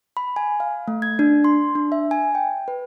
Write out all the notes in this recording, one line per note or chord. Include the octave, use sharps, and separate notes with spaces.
B5
G#5
F5
A3
G#6
D4
C6
D4
E5
G#5
G5
B4